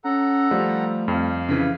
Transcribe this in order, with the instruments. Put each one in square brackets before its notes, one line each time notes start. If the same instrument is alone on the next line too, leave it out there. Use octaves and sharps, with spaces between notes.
[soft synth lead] C#4 [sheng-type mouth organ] A4 F#5 A#5
[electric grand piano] F3 [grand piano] G3 [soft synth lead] A3
[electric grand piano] F2 [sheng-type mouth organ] F5
[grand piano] C#3 E3 [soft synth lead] B6